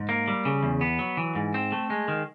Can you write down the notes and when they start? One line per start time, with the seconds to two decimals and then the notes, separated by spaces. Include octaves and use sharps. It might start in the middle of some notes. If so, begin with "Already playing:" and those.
Already playing: G#2
0.09 A#3
0.28 G3
0.45 C#3
0.63 E2
0.81 B3
0.99 F#3
1.17 E3
1.35 G#2
1.54 C4
1.72 A3
1.90 G#3
2.08 D#3